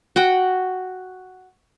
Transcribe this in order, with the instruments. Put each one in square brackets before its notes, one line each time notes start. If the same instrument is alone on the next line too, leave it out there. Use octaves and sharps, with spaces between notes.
[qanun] F#4 F#5 G5